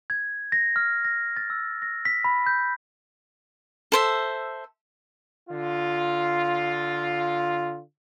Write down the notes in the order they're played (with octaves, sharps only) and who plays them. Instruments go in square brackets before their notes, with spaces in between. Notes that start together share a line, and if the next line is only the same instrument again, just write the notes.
[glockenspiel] G#6
A#6
F6
A#6
A6
E6
A#6
B6
B5
G6
[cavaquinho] A4 C5 E5
[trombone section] D3 F4